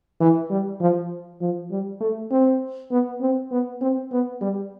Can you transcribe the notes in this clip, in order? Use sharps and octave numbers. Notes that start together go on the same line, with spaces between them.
E3
G3
F3
F3
G3
A3
C4
B3
C4
B3
C4
B3
G3